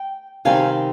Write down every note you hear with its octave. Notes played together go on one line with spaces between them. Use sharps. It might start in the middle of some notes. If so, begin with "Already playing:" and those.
Already playing: G5
C3 D#3 G3 C4 F5 G#5